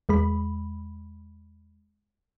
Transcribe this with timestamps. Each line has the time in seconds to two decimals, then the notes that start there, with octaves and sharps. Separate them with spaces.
0.09 E2 G#3 B5